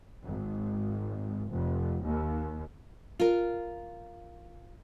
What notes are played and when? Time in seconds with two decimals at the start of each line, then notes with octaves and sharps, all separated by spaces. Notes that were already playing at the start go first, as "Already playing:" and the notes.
0.24 G#1
1.52 F1
2.04 D#2
3.20 F4 A#4